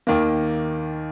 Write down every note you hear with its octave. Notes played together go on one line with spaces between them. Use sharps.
D#2 D#3 A#3